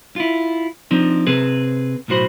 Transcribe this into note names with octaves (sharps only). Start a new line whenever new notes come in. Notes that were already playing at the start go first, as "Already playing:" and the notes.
E4 F4
F3 C4 D4 D#4
C3 C4 G#4 B4
B1 A2 F#4 C5 B5